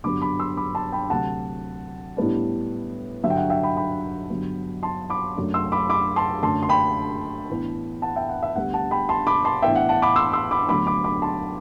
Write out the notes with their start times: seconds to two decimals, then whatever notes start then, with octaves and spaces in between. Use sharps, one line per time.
0.04 G2 D3 F#3 B3 B5 D6
0.21 B5 D6
0.39 C6 E6
0.57 B5 D6
0.75 A5 C6
0.92 G5 B5
1.10 D2 C3 F#3 F#5 A5
2.17 A2 G3 B3 D4
3.23 G2 D3 F#3 E5
3.30 G5
3.37 F#5
3.50 E5 G5
3.63 G5 B5
3.77 G5 B5
4.30 G2 D3 F#3 B3
4.83 A5 C6
5.10 B5 D6
5.36 F#2 F#3 A3 D4
5.54 C6 E6
5.72 B5 D6
5.89 B5 D6
6.16 A5 C6
6.43 F#2 D3 A3 A5 C6
6.63 C6
6.69 G5 B5
7.49 A2 E3 B3 D4
8.02 F#5 A5
8.16 E5 G5
8.29 F#5
8.43 E5
8.56 D2 D3 G3 B3 F#5
8.74 F#5 A5
8.91 G5 B5
9.09 A5 C6
9.27 B5 D6
9.45 A5 C6
9.62 A2 E3 B3 D4 E5 G5
9.76 F#5
9.89 F#5 A5
10.02 B5 D6
10.16 C6 E6
10.33 C6 E6
10.51 B5 D6
10.69 D2 D3 F#3 B3 B5 D6
10.87 B5 D6
11.04 B5 D6
11.22 A5 C6